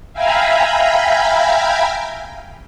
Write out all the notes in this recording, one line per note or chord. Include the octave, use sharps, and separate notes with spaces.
E5 F5 G5 G#5 A#5 B5